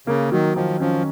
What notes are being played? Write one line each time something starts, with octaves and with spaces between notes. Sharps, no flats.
C#3 A#3
D#3 F#3
D#3 F3
F3 C#4